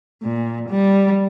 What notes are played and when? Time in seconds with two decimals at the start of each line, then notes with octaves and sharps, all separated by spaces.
0.23 A#2
0.69 G3